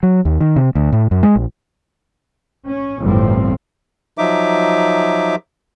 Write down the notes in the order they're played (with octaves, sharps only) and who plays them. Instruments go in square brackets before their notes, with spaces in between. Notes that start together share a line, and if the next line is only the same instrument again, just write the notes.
[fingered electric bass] F#3
D#2
D#3
C3
D2
A2
F#2
G#3
A#1
[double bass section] C#4
G1 E2 A2 F3 G3 C4
[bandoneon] F3 F#3 D#4 E5 D6